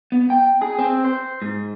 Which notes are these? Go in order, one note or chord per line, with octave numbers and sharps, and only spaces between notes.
B3
G5
G#4
C4
C5
G#2